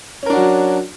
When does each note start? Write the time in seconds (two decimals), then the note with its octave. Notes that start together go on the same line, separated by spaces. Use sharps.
0.23 C#4
0.26 A#4
0.30 D4
0.33 F#4
0.37 F#3